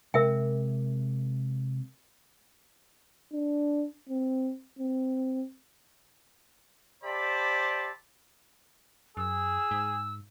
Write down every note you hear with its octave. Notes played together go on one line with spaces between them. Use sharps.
C3 G#3 A#4 E5 G5
D4
C4
C4
G4 C5 D5 E5 A5 B5
F#2 G#4 E6
G#2